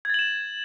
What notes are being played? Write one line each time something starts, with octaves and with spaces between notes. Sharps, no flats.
G#6 A6 E7 F#7